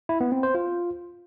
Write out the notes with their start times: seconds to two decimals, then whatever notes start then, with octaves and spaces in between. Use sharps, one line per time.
0.09 E4
0.21 B3
0.32 C4
0.43 C5
0.55 F4